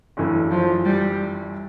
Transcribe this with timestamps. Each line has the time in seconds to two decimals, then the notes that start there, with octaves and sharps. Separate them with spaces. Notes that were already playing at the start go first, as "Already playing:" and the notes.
0.17 G1 F#2 C#3 E3 A3
0.51 F3
0.85 G3